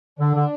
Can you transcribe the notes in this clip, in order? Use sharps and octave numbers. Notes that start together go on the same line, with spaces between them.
D3 D4
D3